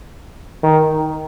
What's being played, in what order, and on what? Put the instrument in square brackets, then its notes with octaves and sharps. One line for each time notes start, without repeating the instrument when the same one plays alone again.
[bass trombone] D#3